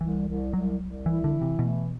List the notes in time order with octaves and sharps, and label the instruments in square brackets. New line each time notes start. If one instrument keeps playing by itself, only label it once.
[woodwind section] C2 [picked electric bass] E3
[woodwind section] C2
[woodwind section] C2 [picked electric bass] F#3
[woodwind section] C2
[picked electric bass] E3 [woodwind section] E4
[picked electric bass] D3
[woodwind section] E3
[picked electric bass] C3
[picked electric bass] B2 [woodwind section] A3